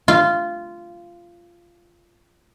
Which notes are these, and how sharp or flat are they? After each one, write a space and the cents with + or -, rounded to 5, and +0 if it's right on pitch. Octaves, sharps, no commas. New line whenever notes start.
F4 -15